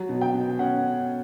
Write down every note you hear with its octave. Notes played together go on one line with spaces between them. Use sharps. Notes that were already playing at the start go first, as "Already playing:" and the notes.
Already playing: F#3
B2
G5
B2
C#4 F#5